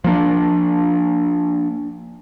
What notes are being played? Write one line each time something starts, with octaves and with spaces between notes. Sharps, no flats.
F3 A#3 D4